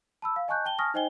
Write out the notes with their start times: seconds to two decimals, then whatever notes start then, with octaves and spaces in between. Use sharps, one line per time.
0.22 A5 B5 E6
0.36 F5
0.48 D#5 G#5 A5 C#6 F#6 G6
0.65 G5 A5 G7
0.78 G#5 A5 C#6 D#6 F6 A#6
0.94 D#4 C5 D#5 G5 G#5 G7